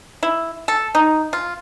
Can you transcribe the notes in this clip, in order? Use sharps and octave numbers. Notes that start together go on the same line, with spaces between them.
E4
A4
D#4
F4